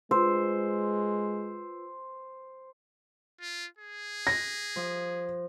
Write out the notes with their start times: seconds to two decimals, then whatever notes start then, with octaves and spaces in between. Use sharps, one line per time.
0.11 G#3 F4 B4 C5 E6
3.41 F4
3.79 G#4
4.27 A#6
4.76 F3